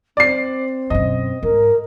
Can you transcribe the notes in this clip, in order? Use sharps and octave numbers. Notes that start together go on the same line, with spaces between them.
C4 D5 C7
F#2 B2 D#5
G#2 A#4